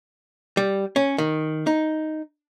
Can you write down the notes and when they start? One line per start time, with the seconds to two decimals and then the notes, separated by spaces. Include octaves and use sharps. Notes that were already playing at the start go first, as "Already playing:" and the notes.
0.57 G3
0.96 C#4
1.18 D#3
1.67 D#4